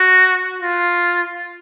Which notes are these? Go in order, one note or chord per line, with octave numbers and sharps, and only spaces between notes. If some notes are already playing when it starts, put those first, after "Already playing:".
Already playing: F#4
F4